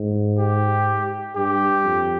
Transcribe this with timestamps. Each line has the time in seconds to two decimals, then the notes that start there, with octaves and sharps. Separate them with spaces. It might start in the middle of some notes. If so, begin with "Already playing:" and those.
Already playing: G#2
0.39 G4
1.36 G2 G4
1.84 F2